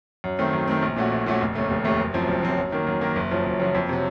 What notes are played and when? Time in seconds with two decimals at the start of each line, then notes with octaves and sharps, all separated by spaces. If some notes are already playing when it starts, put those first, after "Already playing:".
0.24 F#2
0.39 D#3 A3 C4
0.53 F#2
0.68 D#3 A3 C4
0.82 A#1
0.96 A#2 A3 C#4 F#4
1.12 A#1
1.26 A#2 A3 C#4 F#4
1.41 F1
1.55 D#2 C#3 A3
1.70 F1
1.85 D#2 C#3 A3
1.99 F#1
2.14 F#2 F3 C4
2.28 F#1
2.43 F#2 F3 C4
2.57 F#2
2.72 D#3 A#3
2.87 F#2
3.01 D#3 A#3
3.16 F#1
3.31 F#2 C#3 F3
3.46 F#1
3.60 F#2 C#3 F3
3.75 F2
3.89 C3 F#3